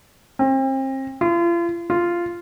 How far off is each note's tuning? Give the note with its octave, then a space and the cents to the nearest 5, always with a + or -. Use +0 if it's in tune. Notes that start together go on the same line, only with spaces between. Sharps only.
C4 +35
F4 -40
F4 -10